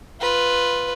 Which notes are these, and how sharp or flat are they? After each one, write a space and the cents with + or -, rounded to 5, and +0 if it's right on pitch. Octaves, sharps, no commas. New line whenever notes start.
F4 +0 B4 +0